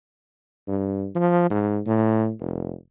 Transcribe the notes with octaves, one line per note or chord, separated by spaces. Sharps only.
G2
F3
G#2
A2
F1